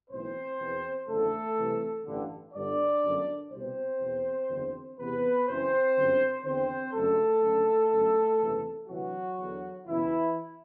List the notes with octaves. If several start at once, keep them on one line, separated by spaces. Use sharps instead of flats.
B1 A2 E3 C4 C5
E2 B2
F#1 E2 D3 A3 A4
C2 C3 E3
A1 G2 D3
G1 G2 D3 D4 D5
G1 F#2 D3
C2 B2 C4 C5
E2 B2
F#1 E2 D3
E2 C3 E3 B3 B4
F#1 F#2 E3 C4 C5
G1 F#2 D3
E2 D3 C4 C5
F#1 F#2 D3 A3 A4
F#1 F#2 D3
G1 F#2 D3
F#1 E2 C3 E3
D2 C3 E3 F#3 F#4
E2 D3
F#1 E2 B2 E3 E4